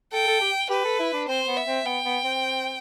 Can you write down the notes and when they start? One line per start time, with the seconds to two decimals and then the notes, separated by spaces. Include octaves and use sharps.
0.13 A4 G5
0.27 A4
0.41 G4
0.70 G4 B4
0.84 A4
0.99 E4
1.14 D4
1.28 C4 C5
1.47 B3
1.57 E5
1.66 C4
1.85 B3 G5
2.05 B3
2.24 C4